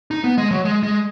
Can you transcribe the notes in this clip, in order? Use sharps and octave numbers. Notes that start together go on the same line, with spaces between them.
D#4
B3
G#3
F#3
G#3
G#3